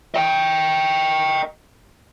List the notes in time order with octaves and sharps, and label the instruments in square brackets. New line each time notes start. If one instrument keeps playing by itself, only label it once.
[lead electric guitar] D#5 G5